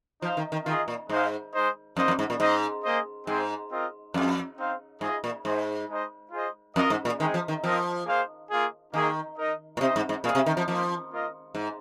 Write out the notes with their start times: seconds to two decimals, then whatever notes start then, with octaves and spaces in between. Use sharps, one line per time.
0.22 F3 D#4 C5 F5
0.37 D#3
0.52 D#3
0.66 D#3 F4
0.69 G#4 D#5
0.88 A#2
1.09 G#2 G#3 D#4 C5 F5
1.53 G#3 D#4 C5 D#5
1.97 F2 A#3 D#4 C5 D#5
2.08 F2
2.19 G#2
2.30 A#2
2.40 G#2 D#4 C5 D#5
2.84 A#3 G#4 C5 D#5
3.27 G#2 C4 G#4 C5
3.71 C4 F4 A#4 D#5
4.14 F2 G#3 C4 F4 G#4
4.58 C4 D#4 C5 F5
5.01 G#2 F4 G#4 D#5
5.24 A#2
5.45 G#2 D#4 G#4 C5
5.88 G#3 D#4 C5 D#5
6.32 F4 G#4 C5 D#5
6.76 F2 F4 A#4 D#5
6.90 G#2
7.05 A#2
7.20 D#3 G#3 C4 D#4 G#4
7.34 F3
7.48 D#3
7.63 F3 C4 F4 A#4 D#5
8.06 A#3 G#4 C5 F5
8.50 A#3 F4 G#4
8.94 D#3 A#3 D#4 G#4
9.37 D#4 A#4 D#5
9.77 A#2
9.81 C3 D#4 C5 D#5
9.96 G#2
10.09 G#2
10.24 A#2 G#3 C4 G#4 F5
10.35 C3
10.46 D#3
10.57 F3
10.68 F3 A#3 D#4 C5
11.11 A#3 F4 A#4 D#5
11.55 G#2